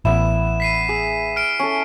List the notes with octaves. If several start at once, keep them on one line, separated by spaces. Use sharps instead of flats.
A1 B3 E4 E7
B6 C7 D#7
G#4
F6 D7
C#4 A4